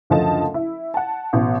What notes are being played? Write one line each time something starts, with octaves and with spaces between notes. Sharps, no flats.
F#1 D2 F3 A4 D#5 A5
E4
F#5 A5
A1 B2